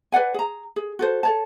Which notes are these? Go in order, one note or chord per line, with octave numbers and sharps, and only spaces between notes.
B4 D5 F#5 G#5
G#4 A#5
G#4
F#4 A4 C5
A4 C#5 A5